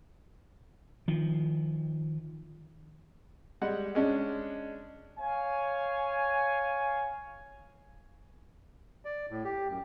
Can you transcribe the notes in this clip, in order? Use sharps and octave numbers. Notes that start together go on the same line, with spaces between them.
D#3 F3
G3 G#3 F#5
G#3 C#4 D4
C#5 F5 G#5
D5
A2
G4
F#2